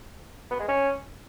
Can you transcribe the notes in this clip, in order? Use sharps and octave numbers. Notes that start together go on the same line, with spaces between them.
B3
G#3
C#4